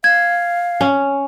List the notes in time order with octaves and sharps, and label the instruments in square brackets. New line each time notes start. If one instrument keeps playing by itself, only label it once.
[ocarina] F5 [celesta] G#6
[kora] C#4